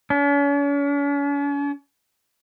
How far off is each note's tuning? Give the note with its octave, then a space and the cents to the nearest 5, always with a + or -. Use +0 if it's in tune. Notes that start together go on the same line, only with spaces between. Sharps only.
C#4 +45